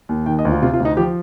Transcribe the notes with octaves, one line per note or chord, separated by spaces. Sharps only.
D#2
D#3 G5
D#5
D2
F4
C3 F4
F4
D2
D#4
F3 G4